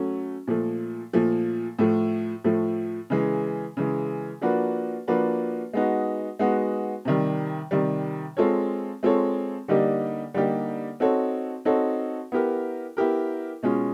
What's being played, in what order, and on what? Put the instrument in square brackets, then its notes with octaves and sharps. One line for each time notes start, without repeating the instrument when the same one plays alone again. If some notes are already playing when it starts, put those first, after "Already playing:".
Already playing: [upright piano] F#3 A3 C#4
A#2 F3 A3
A#2 F3 A3
A2 F3 A3
A2 F3 A3
C#3 E3 G#3
C#3 E3 G#3
F3 A#3 D4 F#4 B4
F3 A#3 D4 F#4 B4
G#3 B3 D#4 F#4
G#3 B3 D#4 F#4
C3 D#3 G3
C3 D#3 G3
G#3 C4 F4 A4 C#5
G#3 C4 F4 A4 C#5
D3 G3 A#3 D#4 G4
D3 G3 A#3 D#4 G4
C4 D#4 F#4 A4 C#5
C4 D#4 F#4 A4 C#5
B3 E4 G4 A#4
B3 E4 G4 A#4
B2 G#3 C#4 F4